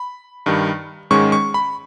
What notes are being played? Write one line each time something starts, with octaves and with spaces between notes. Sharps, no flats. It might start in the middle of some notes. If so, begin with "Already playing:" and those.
Already playing: B5
G2 D#3 G3
G#2 D#3 G#3 C#4 C#6
C#6
B5